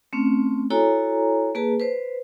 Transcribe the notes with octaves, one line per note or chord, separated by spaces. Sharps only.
A3 C4 C#4
E4 F#4 A4 C#5 G#5 A#5
A#3 G#4 B4 A5
B4 C5